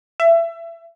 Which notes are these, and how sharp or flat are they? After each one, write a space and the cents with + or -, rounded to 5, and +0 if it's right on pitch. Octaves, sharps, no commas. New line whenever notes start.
E5 +25